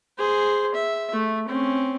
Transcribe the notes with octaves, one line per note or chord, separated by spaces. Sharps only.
G#4 C5
E5
A3
C4 C#4